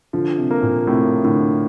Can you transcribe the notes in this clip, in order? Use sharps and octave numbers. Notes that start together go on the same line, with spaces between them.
D3 F3
C3
A#3
A#2
A2 C3
A2 D3